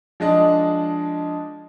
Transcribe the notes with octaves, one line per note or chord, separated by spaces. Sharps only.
F3 G#3 D4 D#5